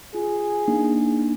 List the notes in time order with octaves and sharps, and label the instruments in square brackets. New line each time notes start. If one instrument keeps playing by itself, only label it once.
[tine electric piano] F4 [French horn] G#4
[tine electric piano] A#3 D4 D#4